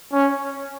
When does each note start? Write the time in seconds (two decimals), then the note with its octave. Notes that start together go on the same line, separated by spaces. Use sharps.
0.13 C#4